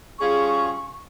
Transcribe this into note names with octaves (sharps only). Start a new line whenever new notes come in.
G3 C#4 F4 G#4 C#6